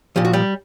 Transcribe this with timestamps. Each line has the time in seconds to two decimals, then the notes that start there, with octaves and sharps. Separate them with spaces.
0.16 A#2 F3 G4
0.25 F#4
0.33 G3 G4